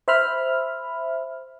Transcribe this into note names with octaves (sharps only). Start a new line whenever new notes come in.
C5 E5 B5 F6